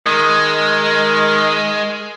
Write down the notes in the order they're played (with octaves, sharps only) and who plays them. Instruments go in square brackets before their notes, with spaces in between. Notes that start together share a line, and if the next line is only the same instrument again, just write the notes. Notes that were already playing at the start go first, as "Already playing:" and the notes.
[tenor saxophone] D#3 [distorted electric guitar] G#3